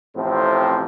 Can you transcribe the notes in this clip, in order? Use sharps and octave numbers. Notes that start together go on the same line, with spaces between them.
A1 A2 C3 F3 C4